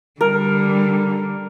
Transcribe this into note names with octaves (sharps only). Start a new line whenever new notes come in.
D3 G3 A#4